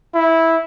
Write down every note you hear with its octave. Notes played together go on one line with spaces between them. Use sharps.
E4